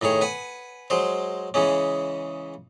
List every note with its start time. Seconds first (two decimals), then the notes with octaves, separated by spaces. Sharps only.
0.02 A2 D#3 G#4 C#5
0.21 B4 F#5 G#5
0.90 F#3 G#3 C5
1.54 C#3 E3 G#3 C#4